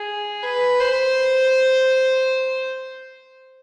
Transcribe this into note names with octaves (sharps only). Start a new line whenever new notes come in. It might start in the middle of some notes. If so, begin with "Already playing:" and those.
Already playing: G#4
B4
C5